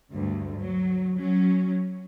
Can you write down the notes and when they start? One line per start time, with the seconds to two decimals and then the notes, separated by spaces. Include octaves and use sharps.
0.12 D2 G2
0.60 F#3
1.17 F#3 C#4